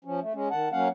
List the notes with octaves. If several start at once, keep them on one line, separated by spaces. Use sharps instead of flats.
F3 C#4
A3
G#3 C#4
D#3 F#5 A5
F#3 A#3 C#4 F5 F#5